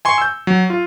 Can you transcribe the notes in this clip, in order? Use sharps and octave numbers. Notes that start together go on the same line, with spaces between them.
G#5 C6 C#6
E6 G6
F#3
F4